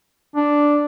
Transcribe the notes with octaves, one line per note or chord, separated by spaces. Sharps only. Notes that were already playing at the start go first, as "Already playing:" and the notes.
D4